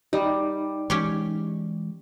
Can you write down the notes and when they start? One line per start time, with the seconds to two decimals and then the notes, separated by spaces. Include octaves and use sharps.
0.13 G3 D#4
0.90 E3 G#3 C#4 G4 C#5